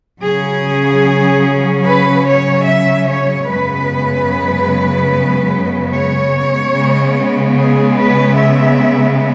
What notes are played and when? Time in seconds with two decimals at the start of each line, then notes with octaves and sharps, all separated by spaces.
0.22 C#3 F#3 C#4 G#4
1.85 B4
2.27 C#5
2.67 E5
3.07 C#5
3.48 F#2 C#3 G#3 B3 B4
5.93 C#5
6.74 C#3 G#3 B3
7.56 G#4
7.97 B4
8.37 E5